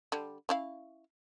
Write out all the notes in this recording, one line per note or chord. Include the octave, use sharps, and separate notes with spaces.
D3 G3
C#4 E4 F5